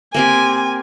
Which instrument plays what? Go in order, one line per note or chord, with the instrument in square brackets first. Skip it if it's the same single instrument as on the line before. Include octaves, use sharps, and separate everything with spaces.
[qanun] A#3 C4 G4 [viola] G#5